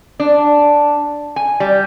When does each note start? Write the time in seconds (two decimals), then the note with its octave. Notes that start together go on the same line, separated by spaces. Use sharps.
0.20 D4
1.36 G#5
1.60 G3